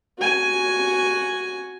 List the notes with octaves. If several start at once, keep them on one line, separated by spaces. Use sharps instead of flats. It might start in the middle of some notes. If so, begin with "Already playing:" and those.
F#4 G#5